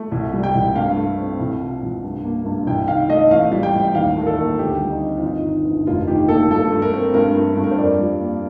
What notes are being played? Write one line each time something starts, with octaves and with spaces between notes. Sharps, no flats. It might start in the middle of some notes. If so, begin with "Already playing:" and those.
Already playing: A3
C2
G3
G5
C2
G2 F5
A3
C4
C2
F3
C2
G2
A#3
G2
C2 G5
D#3 F5
A3 D#5
A1 F5
G3
G5
A1
D#2 F5
A3 A#4
A4
D#2
D2 G4
G3
D#4
C4
F4
G1 D#4
D#3
G1
F1 F4
D#3 G4
A#3 A4
G2 A4
A3
A#4
C4
G2 A#4
A3
G2
A#4
C5
F2 D5
G3
A#3